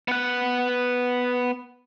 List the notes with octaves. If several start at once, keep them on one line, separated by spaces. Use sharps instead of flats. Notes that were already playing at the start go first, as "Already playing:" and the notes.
B3 F#5